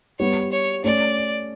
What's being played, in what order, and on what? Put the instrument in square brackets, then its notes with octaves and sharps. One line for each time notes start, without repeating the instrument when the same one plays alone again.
[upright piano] G3 B3 [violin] C#5
[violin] C#5
[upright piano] A3 C#4 [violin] D5